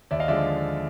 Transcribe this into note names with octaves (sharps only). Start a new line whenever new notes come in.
D#2 D5 E5
D#5 F5
D3 F3 G#3 D5 E5